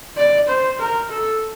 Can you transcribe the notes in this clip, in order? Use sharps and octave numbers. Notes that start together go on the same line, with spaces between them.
D5
C5
A#4
A4